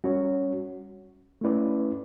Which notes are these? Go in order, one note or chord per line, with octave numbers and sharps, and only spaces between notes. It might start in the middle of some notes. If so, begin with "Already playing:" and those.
G3 C#4 F#4 C#5
A3 C#4 E4 B4 D5